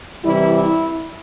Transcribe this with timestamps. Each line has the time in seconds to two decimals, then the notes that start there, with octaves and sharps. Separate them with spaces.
0.23 C3 E3 G3 E4
0.54 E4